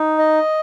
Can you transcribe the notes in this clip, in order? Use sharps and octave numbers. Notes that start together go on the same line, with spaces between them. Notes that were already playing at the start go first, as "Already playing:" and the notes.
Already playing: D#4
D#5